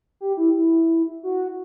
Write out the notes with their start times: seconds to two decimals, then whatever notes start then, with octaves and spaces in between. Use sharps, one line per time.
0.21 G4
0.37 E4
0.54 E4
1.23 F#4